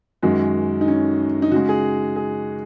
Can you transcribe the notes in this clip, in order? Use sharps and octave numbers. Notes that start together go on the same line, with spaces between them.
F#2 D#3 G#3 F#4
D#4
C#4
D#4
C#3 G#3 F#4
G#4
G#4